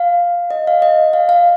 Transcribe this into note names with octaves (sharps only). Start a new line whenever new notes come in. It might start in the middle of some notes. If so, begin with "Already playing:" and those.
Already playing: F5
D#5
F5
D#5
F5
F5